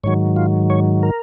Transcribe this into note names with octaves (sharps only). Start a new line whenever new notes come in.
G#2 D#3 F#3 C#5
F4
C#5
A#4